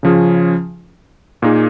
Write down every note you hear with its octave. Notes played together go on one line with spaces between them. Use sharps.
C#3 F3 C#4 F4 G#4
A#2 A#3 D#4 G#4